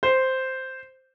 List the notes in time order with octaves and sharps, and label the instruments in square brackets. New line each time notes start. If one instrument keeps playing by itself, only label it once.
[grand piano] C5